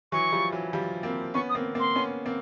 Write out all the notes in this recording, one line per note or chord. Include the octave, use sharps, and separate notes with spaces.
E3 F#3 C#6
F3 G3
E3 F#3
F3 G3
A#3 C4
B3 C#4 C#6
D#6
A#3 C4
A#3 C4 C6
B3 C#4
A#3 C4